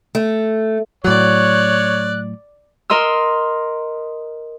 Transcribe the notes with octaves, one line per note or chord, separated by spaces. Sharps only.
A3
A2 F#3 C#5 D5 F#6
A#4 D#5 C6 E6